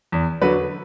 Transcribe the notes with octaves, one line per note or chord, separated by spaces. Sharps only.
E2
D3 F#3 B4